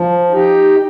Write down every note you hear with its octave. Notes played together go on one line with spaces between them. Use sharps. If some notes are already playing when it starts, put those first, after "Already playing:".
Already playing: F3
D#4 G4